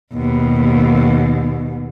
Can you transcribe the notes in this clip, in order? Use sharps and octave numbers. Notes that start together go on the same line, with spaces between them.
D#2 B2